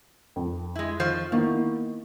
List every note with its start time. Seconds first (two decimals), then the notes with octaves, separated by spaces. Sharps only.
0.36 F2
0.76 G#3 E4
1.00 D#3 F3 C5
1.32 D#3 A#3 B3 E4